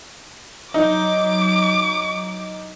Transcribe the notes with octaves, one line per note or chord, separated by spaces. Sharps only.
F#3 D#4 D6